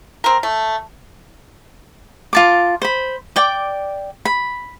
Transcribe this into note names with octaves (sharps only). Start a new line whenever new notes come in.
C4 A#4
A3
F4 A5 D6
C5 B5
D5 G5 D6
B5